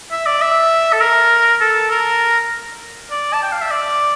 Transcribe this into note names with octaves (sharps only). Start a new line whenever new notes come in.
E5
D5
E5
A4
A#4
A4
A#4
D5
A5
G5
F5
E5
D5